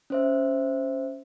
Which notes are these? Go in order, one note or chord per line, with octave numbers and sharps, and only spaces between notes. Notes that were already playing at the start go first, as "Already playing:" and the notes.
C#4 C5 E5